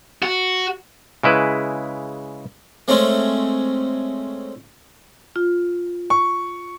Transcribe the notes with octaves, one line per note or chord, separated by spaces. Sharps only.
F#4
C#3 G#3 E4 B4
G#3 A3 C4 C#4
F4
C#6